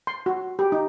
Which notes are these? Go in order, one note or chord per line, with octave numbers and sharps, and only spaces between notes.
C6
F#4
G4
D#4